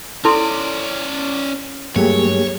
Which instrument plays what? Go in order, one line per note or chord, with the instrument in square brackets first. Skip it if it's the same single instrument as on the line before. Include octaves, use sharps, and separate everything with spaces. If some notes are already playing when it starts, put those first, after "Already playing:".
[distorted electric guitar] C#4 D5 [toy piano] E4 A4 C6
[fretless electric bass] G2 F#3 A3 [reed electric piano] A#3 G4 G#4 [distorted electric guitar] C#5